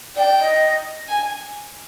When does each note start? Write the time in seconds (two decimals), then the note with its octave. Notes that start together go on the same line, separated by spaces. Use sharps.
0.16 D5 G5
0.40 D#5
1.08 G#5